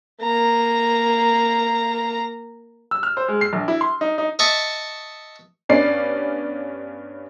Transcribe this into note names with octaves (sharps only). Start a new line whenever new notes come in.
A#3 A#5
E6
F6
C5
G#3
C7
A#1
E4
C6
D#4
D#4
D#5 E5 A5 C#6
G2 B3 C#4 D5 C7